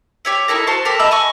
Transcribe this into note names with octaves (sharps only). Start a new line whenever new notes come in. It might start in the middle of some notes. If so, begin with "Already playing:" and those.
G4 C#5 E5
D#4 E4 A4 A#4
F#4 C5 A5 C6
G4 A4 A#4
D#5 E5 A5 B5
D#5 G#5 B5 C#6